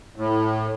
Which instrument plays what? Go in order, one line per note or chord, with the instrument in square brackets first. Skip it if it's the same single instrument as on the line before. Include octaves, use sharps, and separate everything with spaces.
[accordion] A2